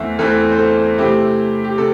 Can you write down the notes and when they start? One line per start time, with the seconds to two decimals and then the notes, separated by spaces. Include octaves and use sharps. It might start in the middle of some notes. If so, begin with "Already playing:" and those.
Already playing: E2 E3 A3 C4 E5
0.18 E2 E3 A3 C4 E4 A4
0.51 C5
0.59 A4
0.98 C3 A3 C4 E4 G4
1.64 G4
1.78 C3 A4